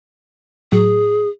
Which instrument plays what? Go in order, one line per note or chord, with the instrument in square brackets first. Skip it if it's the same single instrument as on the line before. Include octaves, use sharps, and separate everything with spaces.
[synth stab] A2 F#3 [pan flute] G#4